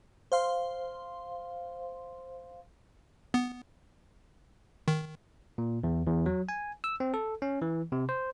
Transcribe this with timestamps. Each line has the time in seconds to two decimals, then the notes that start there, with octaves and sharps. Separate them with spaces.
0.32 C5 F5 C6
3.34 B3
4.88 D#3
5.58 A#2
5.84 E2
6.06 E2
6.26 F#3
6.49 G#5
6.84 E6
7.00 C4
7.14 A4
7.42 C#4
7.62 E3
7.92 C3
8.09 C5